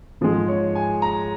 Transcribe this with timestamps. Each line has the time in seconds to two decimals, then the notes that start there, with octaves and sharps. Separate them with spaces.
0.21 G#2 F3 G#3
0.48 C#5
0.75 G#5
1.02 A#5